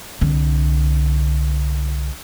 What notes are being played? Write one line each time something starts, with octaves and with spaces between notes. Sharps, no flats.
C2 D3